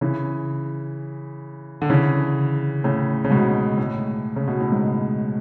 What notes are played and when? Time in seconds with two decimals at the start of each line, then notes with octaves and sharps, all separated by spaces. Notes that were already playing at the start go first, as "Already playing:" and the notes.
0.01 C#3 E3
1.82 D3
1.90 C#3 E3
2.84 A2 C#3
3.25 C#3
3.31 G#2 B2
3.77 A2
4.36 C#3
4.48 B2
4.60 A2
4.72 G#2